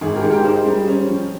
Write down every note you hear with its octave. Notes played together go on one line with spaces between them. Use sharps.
G#1 G#4
G4 A#4
G#2
G4 A#4
D#4 G#4 C5
G3
C#4
F3